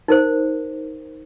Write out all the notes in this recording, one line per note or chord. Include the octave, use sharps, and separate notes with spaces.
D#4 A#4 C5